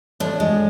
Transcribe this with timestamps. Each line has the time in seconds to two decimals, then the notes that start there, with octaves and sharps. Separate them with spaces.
0.20 A2 D4
0.40 G#3